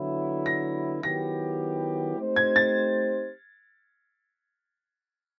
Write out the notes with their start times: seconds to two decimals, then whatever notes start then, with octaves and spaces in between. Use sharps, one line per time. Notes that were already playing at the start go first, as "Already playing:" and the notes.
Already playing: D3 F#3 B3 E4
0.46 A#6
1.03 D#3 F#3 B3 E4 G4 A#6
2.17 A3 C4 D#4 G4 C5
2.36 G#6
2.56 A6